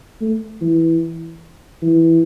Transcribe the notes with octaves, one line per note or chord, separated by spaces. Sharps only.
A3
E3
E3